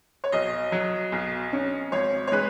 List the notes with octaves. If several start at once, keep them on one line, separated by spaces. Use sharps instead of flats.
C#5
B1 D#5
F#3
B1
C#4
G#1 C#5
C#5
G#3 B4